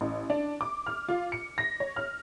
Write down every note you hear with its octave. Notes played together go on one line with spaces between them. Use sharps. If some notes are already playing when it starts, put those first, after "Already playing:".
A1
D4
D6
F6
F4
C#7
A#6
C#5
F6